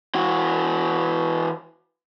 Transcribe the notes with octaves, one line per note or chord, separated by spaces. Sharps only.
E3 F#4